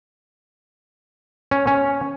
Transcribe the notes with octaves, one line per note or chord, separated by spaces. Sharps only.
C#4
C#4